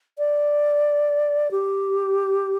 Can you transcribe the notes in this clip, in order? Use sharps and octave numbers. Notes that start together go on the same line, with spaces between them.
D5
G4